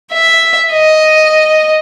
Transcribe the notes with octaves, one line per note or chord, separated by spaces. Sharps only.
E5
D#5